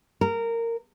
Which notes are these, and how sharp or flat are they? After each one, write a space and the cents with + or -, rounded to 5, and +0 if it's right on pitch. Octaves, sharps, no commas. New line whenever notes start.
A#4 -15